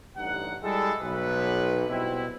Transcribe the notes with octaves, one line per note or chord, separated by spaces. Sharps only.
A1 G2 D#4 F#5
G3 G#3 E4 G4 A4
B1 B4
B2 G3 C4 E4